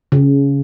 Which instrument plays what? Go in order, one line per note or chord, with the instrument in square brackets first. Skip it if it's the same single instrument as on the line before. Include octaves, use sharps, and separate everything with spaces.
[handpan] C#3